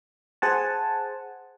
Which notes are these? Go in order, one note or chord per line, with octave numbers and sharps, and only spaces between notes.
G#4 C5 F#5 G#5 A5